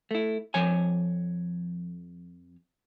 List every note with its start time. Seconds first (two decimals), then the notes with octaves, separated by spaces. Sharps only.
0.11 A3 E4
0.54 F2 F3 C#5 G#5